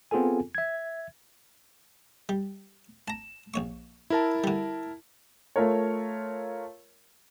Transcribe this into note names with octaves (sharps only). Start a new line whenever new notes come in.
B3 C4 F4 G#4 A4 G#5
E5 G#6
G3
A5 A#5 E7
A#1 C#5 C#6
E4 A#4 A5
D3 G3
A3 F4 A#4 C#5